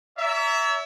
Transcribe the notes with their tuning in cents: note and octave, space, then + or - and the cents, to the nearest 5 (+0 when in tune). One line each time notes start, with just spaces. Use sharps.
C#5 +45 E5 +0 A#5 -20